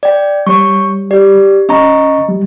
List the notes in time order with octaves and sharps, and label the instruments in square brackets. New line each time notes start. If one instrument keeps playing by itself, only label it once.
[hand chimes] D5 G5
[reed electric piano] G3 [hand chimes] C#5 C#6
[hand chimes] G4 D5
[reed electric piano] C#4 A#5 [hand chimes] D#5 C#6
[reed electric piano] G3